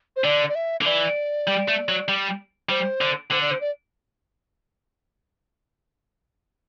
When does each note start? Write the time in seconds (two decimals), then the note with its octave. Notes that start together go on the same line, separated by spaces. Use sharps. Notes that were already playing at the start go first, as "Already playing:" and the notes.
0.16 C5
0.24 D3 D5
0.49 D5
0.55 E5
0.81 D3
0.85 E3 D5
1.47 G3
1.68 A3
1.88 F#3
2.08 G3
2.69 G3 C5
3.01 D3
3.31 D3 C5
3.41 D5
3.51 C5
3.61 D5